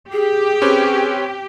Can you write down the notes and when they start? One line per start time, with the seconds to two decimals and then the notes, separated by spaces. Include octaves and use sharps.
0.12 G4 G#4
0.62 C4 C#4 B4